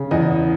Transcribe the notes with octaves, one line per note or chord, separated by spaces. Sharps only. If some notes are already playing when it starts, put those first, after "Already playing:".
Already playing: C#3
E2 D#5